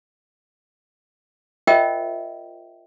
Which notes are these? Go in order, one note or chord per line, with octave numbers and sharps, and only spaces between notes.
F4 A#4 C5 D#5 E5 G5